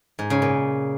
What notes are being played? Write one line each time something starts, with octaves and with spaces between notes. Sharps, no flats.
G#2
C#3
A#2